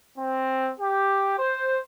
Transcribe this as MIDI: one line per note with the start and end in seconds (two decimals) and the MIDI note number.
0.17 0.71 60
0.80 1.34 67
1.39 1.79 72